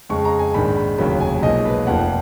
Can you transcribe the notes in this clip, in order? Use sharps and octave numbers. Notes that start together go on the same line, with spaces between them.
F2 C#3 G#3 C#6
A#5
G#5
A#1 G#2 D#3 G#3 B5
B5
F1 D#2 C#3 F#3 A#3 B5
G#5
B1 A#2 F3 G#3 D#5
B4
F1 F2 F3 A#3 F#5